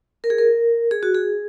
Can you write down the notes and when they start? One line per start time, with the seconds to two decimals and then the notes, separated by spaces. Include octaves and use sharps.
0.24 A#4
0.30 G#4
0.38 A#4
0.91 G#4
1.03 F#4
1.14 G#4